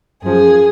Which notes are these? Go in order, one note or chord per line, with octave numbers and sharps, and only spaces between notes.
F#2 F3 G#4